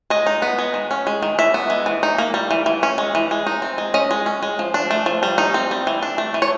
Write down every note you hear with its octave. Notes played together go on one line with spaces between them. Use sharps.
G#3 D#5
D#4
B3
G#3
D#3
C#4
G#3
D#3
E3 E5
B3
G#3
E3
D#4
A#3
G3
E3
E3
C#4
G#3
E3
G#3
D#4
C4
G#3
C#4 D#5
G#3
C#4
G#3
F3
D4
A3
F3
G3
D#4
C4
G3
E3
D4
A3
E3
C#5